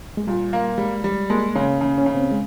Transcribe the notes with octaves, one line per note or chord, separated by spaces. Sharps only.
G#3
A#2 G3
A#3
G3 G#3
G3
G#3 A#3
C#3 C#4
C#3
C#4
C#3
C4
G#3